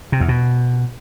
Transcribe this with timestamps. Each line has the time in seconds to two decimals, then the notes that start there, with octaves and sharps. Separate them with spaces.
0.12 C3
0.20 E2
0.29 B2